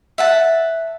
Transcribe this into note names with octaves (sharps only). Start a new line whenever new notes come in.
E5 F#5 A5